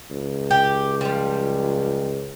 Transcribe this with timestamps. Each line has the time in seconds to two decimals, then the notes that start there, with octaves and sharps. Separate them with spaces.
0.10 C#2
0.51 G4
1.01 F3 G3